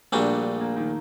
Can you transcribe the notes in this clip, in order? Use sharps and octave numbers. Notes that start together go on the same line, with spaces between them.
A#1 A#2 G3 A3 D4 F#4
A#3
D#3